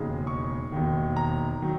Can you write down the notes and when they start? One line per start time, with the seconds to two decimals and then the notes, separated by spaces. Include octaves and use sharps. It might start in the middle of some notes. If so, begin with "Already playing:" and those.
Already playing: E1 D#2 C#3 G#3 D#4
0.27 C#6
0.72 E1 D#2 D#3
1.16 A#5
1.62 D#3 F#3